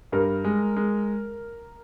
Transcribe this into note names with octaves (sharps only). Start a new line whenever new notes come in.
G2 A#4
G#3
G#3